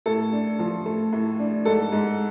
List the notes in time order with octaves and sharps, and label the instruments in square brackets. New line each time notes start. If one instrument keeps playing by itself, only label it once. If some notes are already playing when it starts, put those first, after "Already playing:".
[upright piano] A2 A4
D4
F3
A3
A2
D4
G#2 A4
G#2